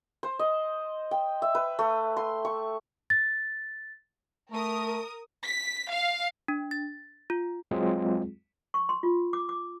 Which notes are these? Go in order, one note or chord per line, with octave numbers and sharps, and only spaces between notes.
C5
D#5
G5
E5
B4
A3
C6
C#6
A6
A3 A#4 D#6
B6
F5
D4
A6
F4
F#3 G#3 C4 F4 G#4
C#6
C6
F4
D6
D6